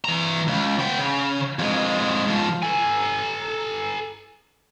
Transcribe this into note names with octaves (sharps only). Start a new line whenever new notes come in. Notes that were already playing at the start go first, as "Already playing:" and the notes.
E3 A#5
C#2
B3 G5
C#3
F2 G#3
G#2 F3
A4 G#5